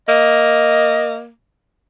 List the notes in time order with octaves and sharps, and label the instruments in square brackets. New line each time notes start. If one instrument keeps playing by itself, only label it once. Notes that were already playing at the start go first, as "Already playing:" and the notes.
[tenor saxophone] A#3 [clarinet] D#5